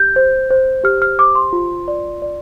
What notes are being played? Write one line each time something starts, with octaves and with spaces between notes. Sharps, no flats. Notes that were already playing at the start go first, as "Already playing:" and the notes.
Already playing: G4 G6
C5
C5
G4 F6
F6
C5 D6
C6
F4
D5
D5